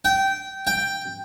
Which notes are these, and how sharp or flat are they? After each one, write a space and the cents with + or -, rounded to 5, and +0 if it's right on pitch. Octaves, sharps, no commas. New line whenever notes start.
G5 -15
G5 +5